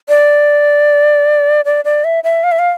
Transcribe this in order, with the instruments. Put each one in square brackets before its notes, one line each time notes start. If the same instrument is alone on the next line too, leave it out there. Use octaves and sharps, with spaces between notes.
[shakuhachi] D5
D5
D5
E5
E5
F5
E5
F5